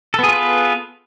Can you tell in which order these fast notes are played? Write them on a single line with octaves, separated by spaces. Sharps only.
A4 B3 G#4 F4 B4